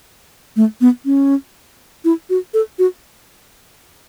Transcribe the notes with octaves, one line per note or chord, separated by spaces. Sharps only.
A3
B3
C#4
E4
F#4
A4
F#4